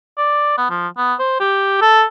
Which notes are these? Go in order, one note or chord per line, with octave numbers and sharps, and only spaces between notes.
D5
B3
F3
B3
C5
G4
A4